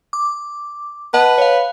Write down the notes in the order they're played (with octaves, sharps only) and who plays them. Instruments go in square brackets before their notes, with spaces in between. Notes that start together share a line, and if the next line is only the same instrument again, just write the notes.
[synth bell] D6
[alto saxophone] B4 [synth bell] D#5 F#5 A5
[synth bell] C#5 F5